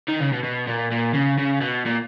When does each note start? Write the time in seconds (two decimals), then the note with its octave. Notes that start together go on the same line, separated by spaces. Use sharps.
0.09 D#3
0.20 C#3
0.32 B2
0.43 B2
0.67 A#2
0.91 A#2
1.14 C#3
1.38 C#3
1.61 B2
1.86 A#2